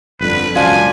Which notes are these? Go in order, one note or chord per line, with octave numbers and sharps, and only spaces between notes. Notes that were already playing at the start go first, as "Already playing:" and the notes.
G1 F2 D3 B4
E1 C#2 F#2 F3 F4 D5 G#5 A5